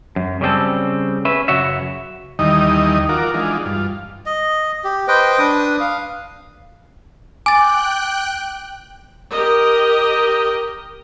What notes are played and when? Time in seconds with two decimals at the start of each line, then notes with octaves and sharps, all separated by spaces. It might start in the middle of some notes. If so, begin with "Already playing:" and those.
0.16 F#2
0.41 C#3 G3 C4 A4
1.25 C#4 B4 E5
1.48 F#2 C#3 F#4 C#5 E5
2.39 D#2 D#3 E3 G3 D#4 D#5
3.09 F4 F#4 A#4 D6
3.34 E3 G#3 D4 D#4 F4
3.66 G2 F4
4.26 D#5
4.84 G4
5.08 B4 C5 D#5 G5
5.39 D4 B4 D#6
5.80 F5
7.46 G5 G#5 D6 F#6 A6
9.30 G4 A#4 D#5